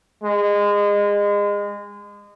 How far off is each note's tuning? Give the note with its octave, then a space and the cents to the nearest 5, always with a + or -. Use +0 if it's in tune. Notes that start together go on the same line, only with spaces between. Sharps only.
G#3 -25